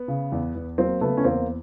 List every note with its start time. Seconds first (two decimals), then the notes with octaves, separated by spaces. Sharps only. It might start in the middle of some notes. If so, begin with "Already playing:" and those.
Already playing: B3
0.08 C#3
0.32 E2
0.55 E2
0.78 F#3 A#3 C4
1.01 C#3 A3 B3
1.17 C#4
1.24 E2 A#3 C4